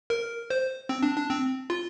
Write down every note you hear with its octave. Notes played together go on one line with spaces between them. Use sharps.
A#4
C5
C4
D4
D4
C4
F4